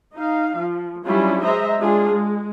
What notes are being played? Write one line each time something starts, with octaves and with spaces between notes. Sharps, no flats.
D#4 F5
F3
F#3 G3 C#4 D4 E4 F4
G#3 C5 D#5 E5 A#5
G#3 D4 F4 G#4
G#3